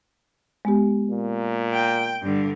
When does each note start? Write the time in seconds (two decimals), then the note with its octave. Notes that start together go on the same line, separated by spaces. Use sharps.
0.65 G#3 B3 G4
1.10 A#2
1.74 G5
2.22 G2 D3